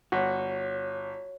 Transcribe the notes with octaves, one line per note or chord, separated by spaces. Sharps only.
G1 F#4 C#5